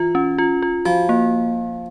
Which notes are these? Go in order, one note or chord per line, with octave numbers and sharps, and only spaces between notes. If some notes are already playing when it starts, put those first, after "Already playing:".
Already playing: E3 F4
C#4
F4
F4
F3 F#4
A#3